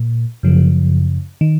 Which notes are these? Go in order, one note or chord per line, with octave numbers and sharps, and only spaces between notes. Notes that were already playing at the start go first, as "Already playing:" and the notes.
Already playing: A#2
F#2 C#3 F3
D#3